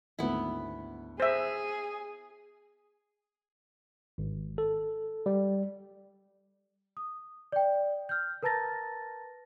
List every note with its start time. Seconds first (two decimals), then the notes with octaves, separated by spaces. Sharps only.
0.19 G#1 D2 B3 E4 B4
1.20 G#4 C5 E5 A#6
4.18 G#1
4.58 A4
5.26 G3
6.97 D#6
7.52 D5 G5
8.09 F6 G6
8.43 A#4 B4 A5 A#5 A6 A#6